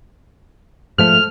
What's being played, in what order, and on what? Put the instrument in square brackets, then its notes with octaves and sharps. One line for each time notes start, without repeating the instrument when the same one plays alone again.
[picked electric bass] G#2 F3 A3 [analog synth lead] F6